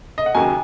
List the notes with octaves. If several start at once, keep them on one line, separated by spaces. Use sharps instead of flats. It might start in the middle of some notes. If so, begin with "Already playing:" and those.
D#5
F#5
D#2 C#3 F#3 G#5